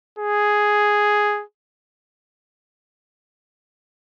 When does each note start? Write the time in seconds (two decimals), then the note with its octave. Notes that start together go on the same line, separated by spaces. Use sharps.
0.19 G#4